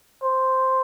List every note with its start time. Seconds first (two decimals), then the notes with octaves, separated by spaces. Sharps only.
0.23 C5